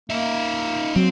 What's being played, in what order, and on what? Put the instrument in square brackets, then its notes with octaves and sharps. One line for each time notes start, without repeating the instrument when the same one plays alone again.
[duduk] A#3 [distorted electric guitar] D#4 E5
[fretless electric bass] F#3 [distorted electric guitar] C4